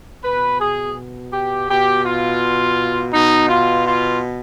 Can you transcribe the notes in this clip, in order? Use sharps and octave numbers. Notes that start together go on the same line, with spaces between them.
B2 B4
G#4
G4
B2 G4
F4
B2 D#4
F4
F4